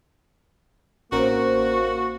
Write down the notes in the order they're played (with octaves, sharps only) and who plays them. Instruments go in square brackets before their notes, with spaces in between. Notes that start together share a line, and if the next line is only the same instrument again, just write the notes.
[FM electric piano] A1 C#4 A#4 [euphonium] A#3 [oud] C4 D#4 G4 [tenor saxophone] F#4